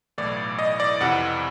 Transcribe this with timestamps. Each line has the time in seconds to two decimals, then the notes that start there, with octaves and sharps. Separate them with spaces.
0.18 B1 A2 E3 D5
0.59 D#5
0.80 D5
1.00 F2 C3 E3 F#5